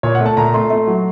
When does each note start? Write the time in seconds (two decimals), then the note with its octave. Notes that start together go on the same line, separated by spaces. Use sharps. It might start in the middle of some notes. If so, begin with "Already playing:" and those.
0.03 A#2 C#5
0.15 F#5
0.20 A3
0.26 A5
0.37 A#2 A#5
0.54 A3 C6
0.70 A3
0.87 F#3